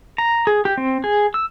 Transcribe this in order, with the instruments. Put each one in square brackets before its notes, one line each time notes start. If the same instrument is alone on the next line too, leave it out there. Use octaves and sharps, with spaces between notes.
[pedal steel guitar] A#5
G#4
G4
C4
G#4
E6